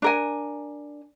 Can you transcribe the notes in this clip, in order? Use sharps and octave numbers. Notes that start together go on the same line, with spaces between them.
D4 A#4 G#5